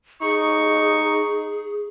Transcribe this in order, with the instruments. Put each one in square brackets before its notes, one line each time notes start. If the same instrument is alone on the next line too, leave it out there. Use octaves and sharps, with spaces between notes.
[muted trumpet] D#4 [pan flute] G#4 [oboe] C#6